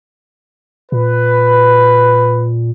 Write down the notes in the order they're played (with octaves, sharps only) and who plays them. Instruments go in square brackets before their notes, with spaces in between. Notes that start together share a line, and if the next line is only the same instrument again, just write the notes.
[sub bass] A#2 [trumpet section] B4